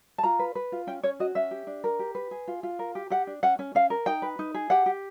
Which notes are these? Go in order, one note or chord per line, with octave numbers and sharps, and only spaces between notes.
A5
F4 A#5
B4
B4
F4
C#4 G5
C#4 C#5
F#4 D#5
C#4 E5
G4
D4
A#4
G4
B4
G#4
F4
F4
A#4
G4
G4 F#5
D4
C#4 F#5
C#4
C#4 F5
A#4
D#4 G5
B4
D#4
G#4
G4 F#5
G4